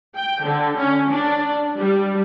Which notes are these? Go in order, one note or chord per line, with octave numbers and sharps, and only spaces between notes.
G5
D3
C#4
D4
G3